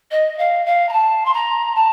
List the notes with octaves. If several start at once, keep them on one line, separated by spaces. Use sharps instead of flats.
D#5
F5
F5
A#5
A5
C6
A#5
A5